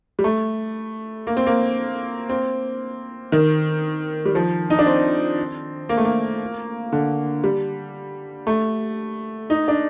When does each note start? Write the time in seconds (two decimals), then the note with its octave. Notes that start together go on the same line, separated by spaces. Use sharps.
0.19 G3
0.24 A3
1.27 A#3
1.37 C4
1.46 A#3
2.29 C4
3.32 D#3
4.25 G3
4.35 F3
4.70 D#4
4.79 D4
4.86 C4
5.89 A#3
5.97 A3
6.05 A#3
6.93 D3
7.44 G3
8.47 A3
9.50 D#4
9.68 D4